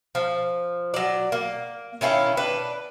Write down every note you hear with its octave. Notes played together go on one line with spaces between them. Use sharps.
F3
F#3 D5
A#3
D#3 C#4 E4 F4
D4 B4